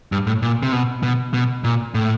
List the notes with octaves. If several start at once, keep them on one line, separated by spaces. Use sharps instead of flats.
G2
A2
A#2
C3
B2
B2
B2
A#2
A2